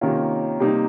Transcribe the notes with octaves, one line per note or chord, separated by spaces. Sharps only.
C3 D#3 A#3 C#4 F4
C3 G3 A#3 D#4